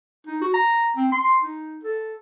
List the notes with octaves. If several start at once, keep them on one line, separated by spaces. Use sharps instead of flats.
D#4
F#4
A#5
C4
C6
D#4
A4